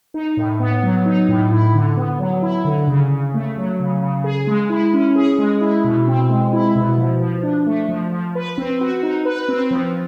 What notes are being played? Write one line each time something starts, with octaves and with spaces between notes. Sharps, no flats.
D#4
A2
B3
F#3
D#4
A2
E4
D3
B3
F#3
E4
D3
C#3
C#3
A3
F#3
C#3
C#3
G#4
G#3
E4
C#4
G#4
G#3
E4
B2
C4
G#3
E4
B2
F3
F3
D4
A3
F3
F3
B4
C4
F#4
D#4
B4
C4
F3